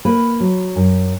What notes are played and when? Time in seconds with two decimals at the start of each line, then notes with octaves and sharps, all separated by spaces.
0.05 A#3 B4
0.40 F#3
0.76 F#2